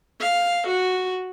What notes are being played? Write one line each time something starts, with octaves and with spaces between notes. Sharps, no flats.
F5
F#4